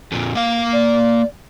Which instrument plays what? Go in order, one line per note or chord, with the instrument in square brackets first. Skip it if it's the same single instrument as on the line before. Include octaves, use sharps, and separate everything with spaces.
[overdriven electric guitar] F2 A#2
A#3 F5
[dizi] D5